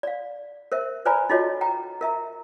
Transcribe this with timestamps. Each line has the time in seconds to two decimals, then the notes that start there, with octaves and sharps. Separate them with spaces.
0.03 D5 F5
0.72 A#4 C5 E5
1.05 B4 C5 D5 G#5 A#5 B5
1.29 D#4 F4 F#4 A4 C#5 D#5
1.61 G5 A#5
2.01 A#4 E5 A#5